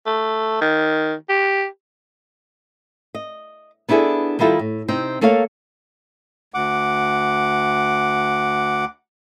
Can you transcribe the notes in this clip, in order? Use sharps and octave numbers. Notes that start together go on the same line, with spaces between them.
A3
D#3
G4
D#5
B3 D4 E4 F4 G#4 A4
D#3 G3 E4 F4 A4
A2
C3 C4 D#4
A3 A#3 A4 C#5 F5
D2 F#5 D6